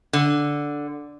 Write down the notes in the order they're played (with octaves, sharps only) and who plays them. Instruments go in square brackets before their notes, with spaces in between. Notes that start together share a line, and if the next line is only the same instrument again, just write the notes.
[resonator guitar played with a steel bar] D3